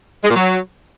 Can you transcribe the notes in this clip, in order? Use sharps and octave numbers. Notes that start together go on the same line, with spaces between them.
G#3
A#2
F#3